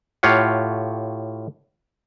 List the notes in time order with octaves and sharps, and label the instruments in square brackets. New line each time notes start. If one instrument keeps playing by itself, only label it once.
[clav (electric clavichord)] A2 F4 G4 C#5 F5 F#5